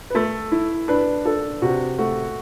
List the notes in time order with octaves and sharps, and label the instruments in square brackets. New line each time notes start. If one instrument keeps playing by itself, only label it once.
[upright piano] B4
[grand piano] A3 [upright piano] A4
[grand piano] E4
[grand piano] D4 [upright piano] B4
[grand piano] D4 [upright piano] A4
[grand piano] C3 [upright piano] F#4
[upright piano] A3 [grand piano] F#4